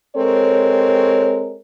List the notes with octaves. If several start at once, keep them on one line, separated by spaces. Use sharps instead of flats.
G#3 C4 A4 A#4 C#5